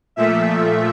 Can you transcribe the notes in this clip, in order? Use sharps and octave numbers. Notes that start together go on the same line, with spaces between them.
A#2 F3 A3 E5